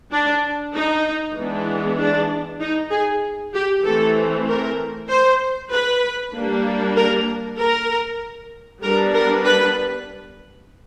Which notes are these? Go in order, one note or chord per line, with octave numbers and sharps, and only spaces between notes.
D4
D#4
E3 G#3 B3 D4
D4
D#4
G#4
G4
E3 A3 C4 A4
A#4
C5
B4
G3 A#3 D4
A#4
A#4
G3 B3 D4 A#4
A#4
B4